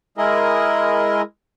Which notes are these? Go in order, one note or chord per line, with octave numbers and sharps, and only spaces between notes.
G#3 E4 G#4 A#4 D#5